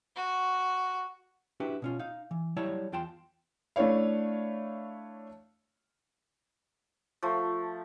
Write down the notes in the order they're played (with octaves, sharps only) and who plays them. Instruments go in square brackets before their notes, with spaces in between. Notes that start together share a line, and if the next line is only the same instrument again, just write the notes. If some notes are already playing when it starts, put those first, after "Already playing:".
[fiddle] F#4
[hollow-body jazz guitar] D4 E4 F#4 G4 B4
B2 C#4 F4
D#4 F5
E3
F#3 G3 E4 C#5 A5
E2 F4 G5 A5 C6
[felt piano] A3 D4 E4 C#5 F5
[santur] F3 A3